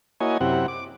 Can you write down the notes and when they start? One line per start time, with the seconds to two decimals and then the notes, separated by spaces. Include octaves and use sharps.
0.20 A#3 E4 F#4 C#5 D#5 G#5
0.41 F#2 C3 C4 E4 G4 F#5
0.68 D6